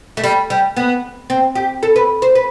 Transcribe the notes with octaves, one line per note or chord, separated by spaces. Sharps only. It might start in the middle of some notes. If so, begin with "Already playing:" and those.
A3
G3
G3
B3
C4
G4
A4
B4
C5
B4